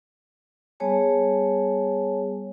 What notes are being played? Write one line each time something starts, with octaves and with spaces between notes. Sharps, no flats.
G3 B3 G#4 C#5 G#5 A5